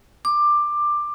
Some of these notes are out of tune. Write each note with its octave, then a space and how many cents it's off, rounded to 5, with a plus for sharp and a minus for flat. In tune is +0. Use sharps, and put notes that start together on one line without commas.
D6 +15